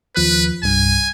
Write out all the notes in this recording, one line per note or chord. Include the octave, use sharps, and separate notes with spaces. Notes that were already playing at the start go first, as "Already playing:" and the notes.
D#2 F3 B4 F#6
C2 G2 G#5